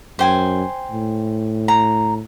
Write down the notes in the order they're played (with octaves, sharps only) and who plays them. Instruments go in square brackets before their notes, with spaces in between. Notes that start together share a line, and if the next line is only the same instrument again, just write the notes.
[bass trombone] F#2 [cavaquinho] C5 G5 G#5
[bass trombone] A2
[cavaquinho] A#5